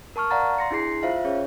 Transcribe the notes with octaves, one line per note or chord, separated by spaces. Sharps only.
A#4 A5 C#6 F6
D5 F5 F#5 A#5 A6
C6 A#6 C#7
D4 E4 G#4 C7
F4 C5 E5 F5
C#4 G#4 C#5